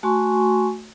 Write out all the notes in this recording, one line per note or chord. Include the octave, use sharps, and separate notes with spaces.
A3 F#4 G#5 C6 C#6